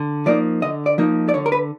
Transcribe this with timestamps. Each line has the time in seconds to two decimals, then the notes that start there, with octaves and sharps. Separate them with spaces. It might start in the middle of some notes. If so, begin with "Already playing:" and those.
Already playing: D3
0.26 F3 A#3 D#4 D5
0.62 D3 D#5
0.86 D5
0.98 F3 A#3 D#4
1.29 D5
1.34 D3 C#5
1.46 A#4
1.52 B4